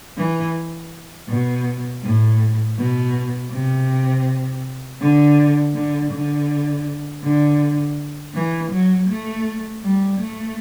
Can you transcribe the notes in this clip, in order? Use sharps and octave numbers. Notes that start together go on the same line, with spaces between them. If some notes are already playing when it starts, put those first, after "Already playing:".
E3
B2
A2
B2
C3
D3
D3
D3
D3
E3
F#3
A3
G3
A3